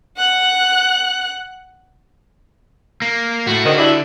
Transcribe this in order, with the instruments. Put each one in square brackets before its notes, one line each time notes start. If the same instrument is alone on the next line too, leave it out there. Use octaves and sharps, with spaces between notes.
[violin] F#5 F#6
[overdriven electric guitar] A#3
[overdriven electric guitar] A2 A3 [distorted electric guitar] F#4
[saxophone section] G#2 D#3 [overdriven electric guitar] D3
[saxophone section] G3 D4 E4